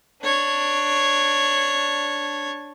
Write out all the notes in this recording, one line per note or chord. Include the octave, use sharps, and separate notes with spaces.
D4 C#5